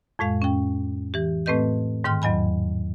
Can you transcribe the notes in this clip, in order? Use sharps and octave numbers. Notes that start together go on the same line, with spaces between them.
F2 A2 G#3 F5
C#4 G5
E3 G4
A2 A3 C4 B4 D#5 G6
G#2 D#3 G5 C6 F6
E2 F#3 D#5 G#5 B5